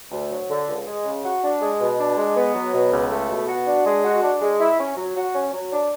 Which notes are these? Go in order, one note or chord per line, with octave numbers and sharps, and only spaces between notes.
D2
F#3
D3
C#2
G#3
C#3
F#4
D4
G#3
B2
D4
G#3
B3
F#3
B2
C#2
A3
B2
F#4
D4
G#3
F#4
D4
G#3
E4
C#4
F#3
F#4
C#4
F#3
D4